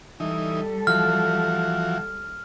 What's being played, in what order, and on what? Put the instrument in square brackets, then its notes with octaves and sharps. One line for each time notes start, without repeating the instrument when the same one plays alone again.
[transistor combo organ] E3 D#4 [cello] G3 A4
[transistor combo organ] E3 F3 F#4 [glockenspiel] F6